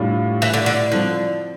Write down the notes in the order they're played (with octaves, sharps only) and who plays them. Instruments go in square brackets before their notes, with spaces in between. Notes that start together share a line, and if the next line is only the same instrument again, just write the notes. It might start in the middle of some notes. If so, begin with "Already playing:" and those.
Already playing: [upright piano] A2 G3 D4 F4
[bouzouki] E3
D3
D3
[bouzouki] D3 [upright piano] F3 C4 E4